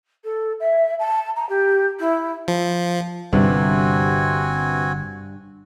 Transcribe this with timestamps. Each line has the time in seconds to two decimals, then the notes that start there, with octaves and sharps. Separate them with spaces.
0.24 A4
0.60 E5
0.99 A5
1.36 A#5
1.49 G4
1.99 E4
2.48 F3
3.33 G1 G2 C3 B3 C4 D4 F#4 G#5